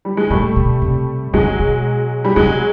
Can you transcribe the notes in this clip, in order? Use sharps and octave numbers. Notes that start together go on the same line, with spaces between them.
G3
G#3
A#2 G3 A3
B2
C3
C3 F#3 G#3
C3
B2
G3
C3 F#3 G#3